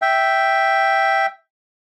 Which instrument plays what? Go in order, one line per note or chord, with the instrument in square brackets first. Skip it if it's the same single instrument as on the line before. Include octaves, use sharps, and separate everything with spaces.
[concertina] E5 G5